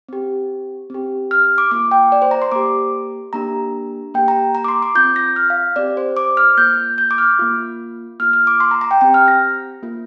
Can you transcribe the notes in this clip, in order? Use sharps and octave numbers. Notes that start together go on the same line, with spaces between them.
C4 G4
C4 G4
F6
D6
A#3 F4 D6
G5
D5
C5
A#5
C6
A#3 G4 D6
A#3 D4 G4 A#5
A#3 G4 G5
A#5
A#5
D6
C6
D6
C4 F4 G6
A#6
F6
F5
C4 G4 D5
C5
D6
F6
A#3 F4 G6
G6
D6
F6
A#3 F4
A#3 F4 F6
F6
D6
C6
A#5
A#5
G5
C4 G4 G5
F6
A#6
A#3 F4